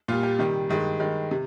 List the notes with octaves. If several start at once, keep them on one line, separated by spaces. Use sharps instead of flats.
A#2 G3 F4
G4
C3 D#3 G3
G2 D#3 G#3
G2 D#3 G#3
C3